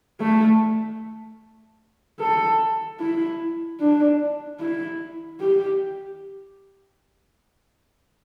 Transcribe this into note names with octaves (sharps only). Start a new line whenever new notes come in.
A3
A4
E4
D4
E4
G4